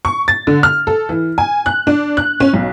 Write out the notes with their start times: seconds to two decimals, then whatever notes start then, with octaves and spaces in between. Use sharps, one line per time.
0.05 C#6
0.28 A6
0.47 D3
0.63 F6
0.87 A4
1.09 E3
1.38 G#5
1.66 F#6
1.87 D4
2.17 F#6
2.40 C#4
2.53 B1